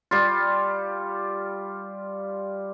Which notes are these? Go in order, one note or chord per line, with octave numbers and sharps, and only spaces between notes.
G3 F4